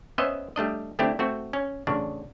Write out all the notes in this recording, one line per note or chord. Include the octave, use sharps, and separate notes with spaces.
B3 C#4 C5 D#5 E5
G3 A3 D4 D#5
D3 A3 C4 D4 E4 G4
A3 C4 F#4
C#4
A1 C#3 D4